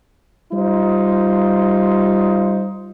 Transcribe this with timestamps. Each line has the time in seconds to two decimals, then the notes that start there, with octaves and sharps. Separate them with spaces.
0.52 G3 D#4 F4 C5